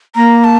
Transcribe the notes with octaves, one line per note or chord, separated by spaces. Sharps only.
A#3 A#5
A5